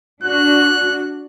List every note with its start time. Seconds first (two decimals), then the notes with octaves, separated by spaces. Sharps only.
0.23 D4 F#4 F#6